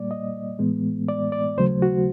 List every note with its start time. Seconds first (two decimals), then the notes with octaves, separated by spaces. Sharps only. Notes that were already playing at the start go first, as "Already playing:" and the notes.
Already playing: A#2 G3 A#3 D5
0.11 D#5
0.59 A2 E3 G#3 B3
1.08 D5
1.32 D5
1.57 D#2 C#3 F#3 A3 C5
1.82 F#4